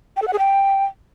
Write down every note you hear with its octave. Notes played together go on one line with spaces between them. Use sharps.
G5
A4
F#5
G#4
G5